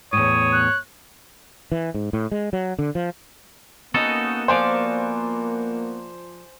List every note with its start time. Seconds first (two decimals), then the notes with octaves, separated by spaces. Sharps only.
0.13 E2 A2 C#5 D#6
0.53 F#6
1.72 E3
1.94 G#2
2.13 A2
2.31 G#3
2.53 F#3
2.79 D3
2.95 F3
3.94 A#3 B3 C#4 D#4 F#4 A4
4.48 F3 C5 D5 F5 G#5 D7